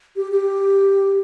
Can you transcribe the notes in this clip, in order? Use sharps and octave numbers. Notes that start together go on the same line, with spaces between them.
G4
G4